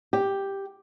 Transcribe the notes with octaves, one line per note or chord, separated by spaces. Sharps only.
G4